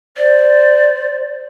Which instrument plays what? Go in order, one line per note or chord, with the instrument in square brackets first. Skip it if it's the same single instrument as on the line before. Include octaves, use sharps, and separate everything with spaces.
[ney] C5 [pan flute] D5